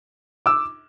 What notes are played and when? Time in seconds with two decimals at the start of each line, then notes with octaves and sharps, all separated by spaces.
0.46 D6 E6